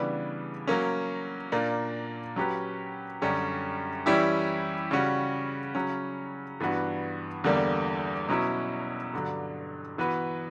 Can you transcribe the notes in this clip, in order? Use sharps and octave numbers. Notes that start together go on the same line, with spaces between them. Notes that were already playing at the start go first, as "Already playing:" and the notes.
Already playing: C#3 E3 G3 B3 D4
F#3 A#3 C#4
A#2 A#3 D4
F#3 C#4 G4 B4
F#2 D3 G3 C#4 G4
E3 G3 C#4 E4 G4
C#3 G3 C#4 F#4
C#3 F#3 C#4
G2 E3 B3 D4 F#4
E2 D3 G3 A#3
B2 F#3 C#4 E4
G2 D3 F#3
E3 B3 F#4 B4